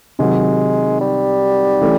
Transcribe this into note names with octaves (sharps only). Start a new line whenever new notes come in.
C3 D#3 F#3 G#3
G3
E3 A3 C#4